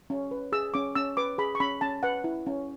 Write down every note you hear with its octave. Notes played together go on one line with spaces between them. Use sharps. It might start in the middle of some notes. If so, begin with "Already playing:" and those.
C#4
B4
G#4 E6
C#4 D6
C#4 E6
B4 D6
G#4 B5
C#6
C#4 B5
C#4 A5
B4 F#5
E4
C#4